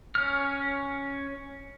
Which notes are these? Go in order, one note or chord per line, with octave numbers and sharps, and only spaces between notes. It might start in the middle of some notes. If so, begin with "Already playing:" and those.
C#4 F6